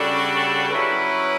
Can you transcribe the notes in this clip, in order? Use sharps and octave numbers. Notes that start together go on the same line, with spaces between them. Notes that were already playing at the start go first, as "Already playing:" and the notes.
Already playing: C#3 G3 D4 F#4 A4
F#3 C#4 E4 B4